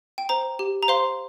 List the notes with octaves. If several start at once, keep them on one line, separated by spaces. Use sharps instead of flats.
G5
C5 A#5
G4
A#5
C5 F5 C6